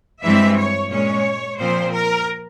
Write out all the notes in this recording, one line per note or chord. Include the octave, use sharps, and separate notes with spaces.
G2 E3 G#3 C4 E5
C#5
A#2 G#3 C#4 C#5
A#2 F3 C4 C5
A#4